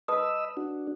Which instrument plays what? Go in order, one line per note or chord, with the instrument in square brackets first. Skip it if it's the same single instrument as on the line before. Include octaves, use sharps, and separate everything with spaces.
[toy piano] B4 A5 D#6 [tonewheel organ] D#5 B5 E6
[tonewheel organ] D4 F#4